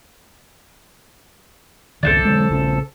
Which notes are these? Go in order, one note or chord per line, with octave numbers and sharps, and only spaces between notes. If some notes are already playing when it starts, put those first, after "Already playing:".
G#1 C#2 D#3 A4 C5 D5
D3 F#3 G#3
A#1 C#3 C#4